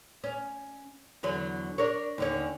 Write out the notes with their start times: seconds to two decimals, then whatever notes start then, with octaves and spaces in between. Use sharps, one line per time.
0.24 C#4
1.23 E2 D3 F#3
1.78 D4 A#4 C#5
2.18 D#2 D3 C#4